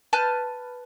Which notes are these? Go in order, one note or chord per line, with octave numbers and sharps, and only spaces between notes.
B4 A5 F6 G6